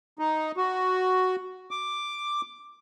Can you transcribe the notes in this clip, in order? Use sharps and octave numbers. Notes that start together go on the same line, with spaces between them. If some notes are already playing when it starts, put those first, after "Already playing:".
D#4
F#4
D6